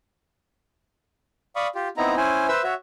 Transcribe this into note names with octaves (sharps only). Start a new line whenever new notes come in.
D5 F5 B5 C#6 D#6
F4 G4
B3 C4 D#4 E4 A#5
C#4 E4 C5 G#5
B4 C5 E5 E6
F#4 C#5 E5